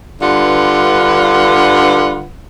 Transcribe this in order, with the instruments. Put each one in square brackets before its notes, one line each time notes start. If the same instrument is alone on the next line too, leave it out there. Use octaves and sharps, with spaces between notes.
[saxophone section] G2 D3 F4 B4 F#5